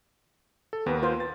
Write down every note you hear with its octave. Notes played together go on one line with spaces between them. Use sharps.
A4
D#2 B3 A#4 B4
F4 C5
A6